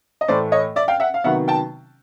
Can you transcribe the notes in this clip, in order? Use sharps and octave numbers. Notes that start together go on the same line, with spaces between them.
D#5
A2 E3 A3 C5 D5
C#5 D#5
D5 E5
F5 G5
E5 F#5
F5
C3 D#3 F#3 B3 E5 F#5
G5 A5